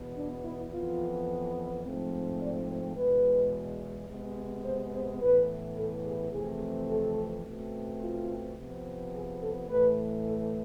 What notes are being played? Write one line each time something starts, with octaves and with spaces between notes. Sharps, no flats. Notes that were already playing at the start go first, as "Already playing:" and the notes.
Already playing: E2 B2 B3
D4
E4
F2 E3 B3 F4
G#2 F3 A3 C4
D5
C5
E2 B2 G#3 B4
C3 G#3 B3
C5
C5
A2 E3 B3 B4
A4
G#4
F2 C3 E3 A3 C4 G#4
A4
B2 A3 C4
F4
C3 F3 B3
G#4
A4
A2 E3 A3 B4
A4